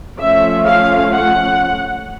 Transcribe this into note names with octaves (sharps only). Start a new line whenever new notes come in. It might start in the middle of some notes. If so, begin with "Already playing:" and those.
F3 A3 C#4 E5
F5
F#5